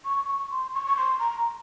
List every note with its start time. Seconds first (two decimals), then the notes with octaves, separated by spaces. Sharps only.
0.05 C#6
0.28 C#6
0.51 C6
0.74 C#6
0.86 C#6
0.97 C6
1.19 A#5